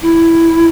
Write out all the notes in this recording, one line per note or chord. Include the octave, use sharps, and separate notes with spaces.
E4